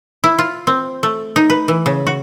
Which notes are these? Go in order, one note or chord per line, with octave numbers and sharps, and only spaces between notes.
E4
F4
C4
A3
D#4
B4
E3
C#3
F#4